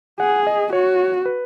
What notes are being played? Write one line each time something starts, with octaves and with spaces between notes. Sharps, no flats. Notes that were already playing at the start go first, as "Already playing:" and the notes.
G#4 F#5
D#5
F#4 C#5
B4